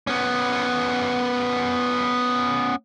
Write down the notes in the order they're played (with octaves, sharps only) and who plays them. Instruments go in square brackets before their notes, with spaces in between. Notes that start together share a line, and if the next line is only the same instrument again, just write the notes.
[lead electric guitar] B3 C#4